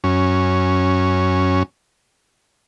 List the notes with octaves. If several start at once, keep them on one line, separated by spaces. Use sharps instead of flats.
F#2 C#4